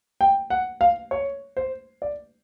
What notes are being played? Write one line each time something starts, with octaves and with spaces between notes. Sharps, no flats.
G5
F#5
F5
C#5
C5
D5